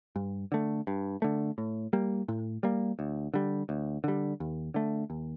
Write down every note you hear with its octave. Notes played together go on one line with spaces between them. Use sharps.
G2
D3 A3
G2
D3 A3
A2
G3 A#3
A2
G3 A#3
D2
D3 G3
D2
D3 G3
D#2
D3 A3
D#2